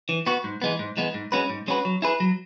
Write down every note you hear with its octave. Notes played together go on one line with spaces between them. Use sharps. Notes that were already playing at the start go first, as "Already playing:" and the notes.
E3
B3 F#4
G#2
E3 G#3 B3
G#2
E3 G#3 B3
G#2
G#3 C#4 F#4 B4
G#2
G#3 C#4 F#4 B4
F#3
E4 G#4 B4
F#3